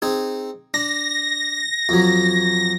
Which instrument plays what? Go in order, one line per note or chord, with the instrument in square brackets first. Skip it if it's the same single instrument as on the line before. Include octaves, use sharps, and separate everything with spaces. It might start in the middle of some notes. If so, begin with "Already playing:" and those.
[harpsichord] C4 D#4 G#4
[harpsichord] D4 [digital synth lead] A#6
[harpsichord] F2 F#3